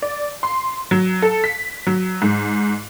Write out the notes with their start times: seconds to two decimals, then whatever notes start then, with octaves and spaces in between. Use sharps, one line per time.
0.02 D5
0.43 C6
0.91 F#3
1.22 A4
1.44 B6
1.87 F#3
2.22 G#2